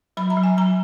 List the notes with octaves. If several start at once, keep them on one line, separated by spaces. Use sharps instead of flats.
F#3 B5
A#5
F#3
G#5
F#3 A#5